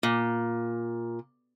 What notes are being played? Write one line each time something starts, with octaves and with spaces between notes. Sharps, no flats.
A#2